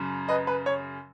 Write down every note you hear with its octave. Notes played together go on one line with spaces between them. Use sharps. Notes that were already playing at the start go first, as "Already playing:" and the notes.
Already playing: F#2 C#3
B4 D#5
B4
C#5